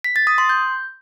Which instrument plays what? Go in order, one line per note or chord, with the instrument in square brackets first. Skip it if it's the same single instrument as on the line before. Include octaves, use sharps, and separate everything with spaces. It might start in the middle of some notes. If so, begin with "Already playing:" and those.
[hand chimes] B6
A6
D#6
C6
G6